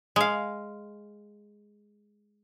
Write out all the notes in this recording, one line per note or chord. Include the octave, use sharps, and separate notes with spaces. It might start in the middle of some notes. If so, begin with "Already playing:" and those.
G#3 F5